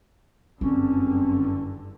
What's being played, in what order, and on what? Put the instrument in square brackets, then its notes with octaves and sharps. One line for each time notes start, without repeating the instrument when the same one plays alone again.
[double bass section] F#1 G2 D3 [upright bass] C4 [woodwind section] C#4